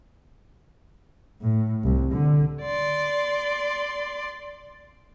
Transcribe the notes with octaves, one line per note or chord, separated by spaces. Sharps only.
A2
C2
D3
D5 C6